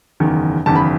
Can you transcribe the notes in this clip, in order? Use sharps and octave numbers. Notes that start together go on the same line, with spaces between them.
F#1 E2 D#3
F#1 E2 D#3 A5
B5